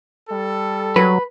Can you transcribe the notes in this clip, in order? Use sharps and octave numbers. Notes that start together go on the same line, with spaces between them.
G3 A4
F#3 B4